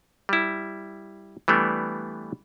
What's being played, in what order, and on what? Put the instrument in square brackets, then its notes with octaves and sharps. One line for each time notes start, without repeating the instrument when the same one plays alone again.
[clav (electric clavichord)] G3 E4
E3 G3 A3 B3 D4